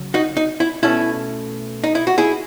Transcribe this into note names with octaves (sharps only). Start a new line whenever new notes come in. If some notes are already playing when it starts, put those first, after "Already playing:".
Already playing: C#3 F#3
D#4 F#4
D#4
E4
B2 A3 C#4 E4
D#4
E4
F#4
E4 G#4